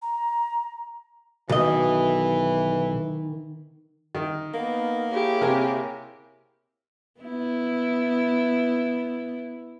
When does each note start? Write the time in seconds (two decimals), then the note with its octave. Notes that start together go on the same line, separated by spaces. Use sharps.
0.02 A#5
1.49 B1 D#3 E3 D#5
4.15 D#3
4.54 A#3 B3 D#4
5.12 E4 G4 G#4 C#5
5.41 C3 A#4 G#5
7.21 B3 E4